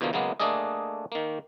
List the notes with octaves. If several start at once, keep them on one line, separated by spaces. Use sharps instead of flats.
E2 B2 D3 F3 A#3
C#3 F#3 G#3 A#3 B3
A3 A#3 D4 G#4 A4 D#5
D#3 A#3